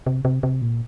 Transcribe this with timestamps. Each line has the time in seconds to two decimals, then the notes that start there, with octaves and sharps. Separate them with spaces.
0.07 C3
0.25 C3
0.43 C3
0.62 A#2